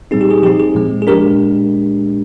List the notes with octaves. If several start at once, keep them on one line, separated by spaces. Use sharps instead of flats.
A#2 G3 C4 D#4 G#4
G4
G#4
F3 C4 D#4 G4
G#4
A#2 F3 G#3
G#4
A#2 G#3 D4 G4 A#4